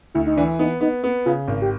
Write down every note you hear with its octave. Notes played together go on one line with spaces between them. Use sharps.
D2 E4
D#4
E3 D4
B3 D#4
B3 D#4
B3
C#3 F4
G#1
G4